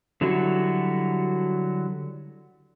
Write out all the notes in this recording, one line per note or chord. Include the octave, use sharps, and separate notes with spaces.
D3 F#3 G3 E4 F#4 A4